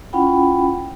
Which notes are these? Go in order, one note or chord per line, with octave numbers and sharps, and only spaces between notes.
C#4 E4 F4 F#5 G5 B5